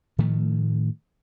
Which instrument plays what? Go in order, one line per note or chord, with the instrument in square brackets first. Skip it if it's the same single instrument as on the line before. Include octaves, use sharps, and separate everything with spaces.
[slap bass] A2 D#3 F3 A3